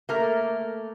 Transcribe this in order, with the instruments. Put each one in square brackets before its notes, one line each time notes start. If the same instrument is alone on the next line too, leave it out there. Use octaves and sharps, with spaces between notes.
[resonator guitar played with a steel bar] A3 A#3 A#4